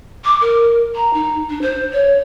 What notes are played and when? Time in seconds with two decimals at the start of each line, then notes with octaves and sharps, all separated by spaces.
0.25 D6
0.41 A#4
0.95 A#5
1.13 D#4
1.49 D4
1.61 C5
1.93 C#5